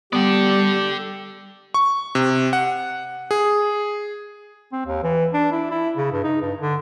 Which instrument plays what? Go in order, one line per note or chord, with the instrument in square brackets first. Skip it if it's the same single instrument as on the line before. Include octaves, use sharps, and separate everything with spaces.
[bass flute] G3 [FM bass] B3 [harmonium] G4 [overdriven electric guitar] A4 D5
[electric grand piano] C#6
C3
F#5
G#4
[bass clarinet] C4
D#2
E3
D4
E4
E4
C#3
G2
D#4
G2
D3